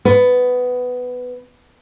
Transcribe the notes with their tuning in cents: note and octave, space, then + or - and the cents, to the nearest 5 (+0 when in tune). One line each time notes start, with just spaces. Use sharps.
B3 +10